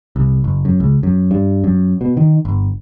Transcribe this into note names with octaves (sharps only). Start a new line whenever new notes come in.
C2
F#1
F#2
C#2
F#2
G2
F#2
B2
D#3
G1